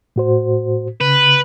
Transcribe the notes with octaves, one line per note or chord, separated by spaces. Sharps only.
A2 F#4 C5
C#3 B4